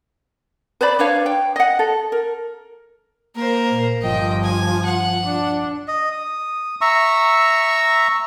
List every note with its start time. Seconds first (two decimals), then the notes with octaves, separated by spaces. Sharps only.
0.81 B4 C5 D5 B5
0.99 D4 B4 C#5 F5
1.26 G5
1.56 D#5 F#5
1.79 A4
2.12 A#4
3.36 A#3 A#4 C5
3.70 A#2
4.02 G1 F3 D#5 G5
4.44 G#5
4.85 F#5
5.25 D4
5.88 D#5
6.12 D#6
6.81 E5 A#5 C#6 E6